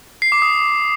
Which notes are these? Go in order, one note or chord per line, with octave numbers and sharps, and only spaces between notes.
C7
D6
D#6